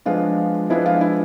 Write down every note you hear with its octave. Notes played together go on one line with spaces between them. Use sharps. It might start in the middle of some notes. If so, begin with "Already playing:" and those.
F3 G#3 B3 D4 F4
F3 G#3 B3 D4 E4
F4
E4